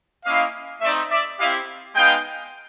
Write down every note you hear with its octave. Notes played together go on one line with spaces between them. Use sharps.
A#3 C#4 E4 D#5 F5
A3 C4 D#4 D5 E5
D5 E5
C4 E4 G4 D#5 F5
G#3 B3 D#4 F5 G5